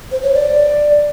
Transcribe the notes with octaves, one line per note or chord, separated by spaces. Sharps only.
C5
C#5
D5